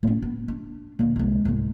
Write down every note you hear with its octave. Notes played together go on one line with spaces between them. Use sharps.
A2 C#4
B3
D4
D2 A#2
C2 G#3
C2 G#2